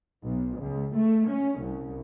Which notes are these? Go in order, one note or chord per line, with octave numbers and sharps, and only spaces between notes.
B1
C#2
A3
C#4
C2